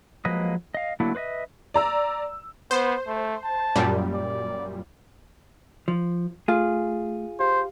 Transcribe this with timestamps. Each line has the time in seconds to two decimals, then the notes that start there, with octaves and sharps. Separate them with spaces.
0.25 F3 F#3 G#3 A#3 B4 D#5
0.75 D#5 F5
1.00 D3 F#3 A3 A#3 E4
1.15 B4 C5 D#5 E5
1.74 D5 A#5 E6
2.71 B3 C5
3.07 A3
3.44 A5
3.76 F#2 A#2 G3
4.14 D5
5.88 F3
6.48 A3 F4 G#4
7.40 G4 C5 F5